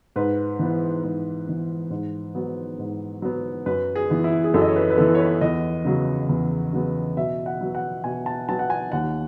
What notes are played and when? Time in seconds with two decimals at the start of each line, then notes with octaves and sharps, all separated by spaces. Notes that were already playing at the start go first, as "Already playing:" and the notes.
0.16 G#2 B4
0.59 E3 B3
1.04 G#2
1.47 E3 B3
1.90 G#2
2.35 F#3 B3
2.79 G#2
3.22 F#3 B3
3.66 F#2 B4
3.96 G#4
4.10 E3 B3
4.24 E4
4.44 G#4
4.54 F#2 A4
4.62 D#5
4.68 C#5
4.76 B4
4.90 B4
4.98 E3 B3 A4
5.15 C#5
5.20 B4
5.41 E2 D#5
5.85 C#3 F#3 B3
6.29 E2
6.73 C#3 F#3 B3
7.17 B2 E5
7.46 F#5
7.61 F#3 B3
7.75 F#5
8.04 B2 G#5
8.26 A5
8.49 F#3 B3 A5
8.59 F#5
8.70 G#5
8.92 D#2 F#5